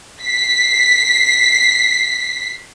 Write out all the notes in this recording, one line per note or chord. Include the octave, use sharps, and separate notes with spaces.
B6 C7